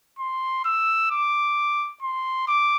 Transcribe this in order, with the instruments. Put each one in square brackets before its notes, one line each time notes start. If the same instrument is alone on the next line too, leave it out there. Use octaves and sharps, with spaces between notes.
[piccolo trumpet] C6
E6
D6
C6
D6